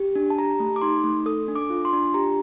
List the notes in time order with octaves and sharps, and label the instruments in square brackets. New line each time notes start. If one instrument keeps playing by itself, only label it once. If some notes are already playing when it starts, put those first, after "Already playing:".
Already playing: [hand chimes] G4
D4
A5
G4 A#5
A3
D6
D#4 C6
A3
A4 D#6
D4
D6
F4
C6
D4
G4 A#5